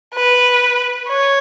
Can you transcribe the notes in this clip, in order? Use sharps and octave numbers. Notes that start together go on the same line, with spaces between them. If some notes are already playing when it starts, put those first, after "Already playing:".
B4
C#5